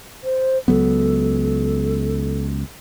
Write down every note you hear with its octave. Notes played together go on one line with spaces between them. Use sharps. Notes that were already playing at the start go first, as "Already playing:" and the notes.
C5
C#2 F#3 B3 A4